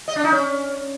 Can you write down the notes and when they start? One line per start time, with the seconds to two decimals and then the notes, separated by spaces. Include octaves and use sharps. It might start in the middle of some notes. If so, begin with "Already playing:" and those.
0.08 D#5
0.16 D4
0.24 D#4
0.32 C#4